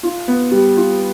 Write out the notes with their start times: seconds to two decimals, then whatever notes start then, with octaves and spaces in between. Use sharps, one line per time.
0.03 F4
0.28 B3
0.52 G3
0.77 F4